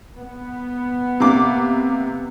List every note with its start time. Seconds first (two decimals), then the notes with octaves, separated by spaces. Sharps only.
0.18 B3
1.20 C3 A#3 D6